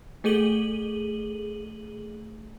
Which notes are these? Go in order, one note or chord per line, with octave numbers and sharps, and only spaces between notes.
A3 G#4 A4 D#7 F#7 G7